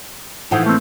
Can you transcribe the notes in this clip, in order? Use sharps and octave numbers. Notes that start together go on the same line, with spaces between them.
A2 E3 F3 D#4 E4 F#5
A3 A#3 C4